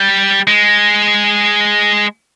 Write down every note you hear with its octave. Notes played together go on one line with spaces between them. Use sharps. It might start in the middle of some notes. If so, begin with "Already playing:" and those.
Already playing: G3
G#3